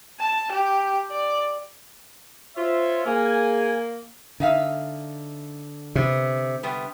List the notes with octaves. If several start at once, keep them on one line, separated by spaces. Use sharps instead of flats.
A5
G4
D5
F4 C5 C#5 E5
A#3 G#4 G#5
D3 D#4 E5 F5
C3 B3
C3 G3 B3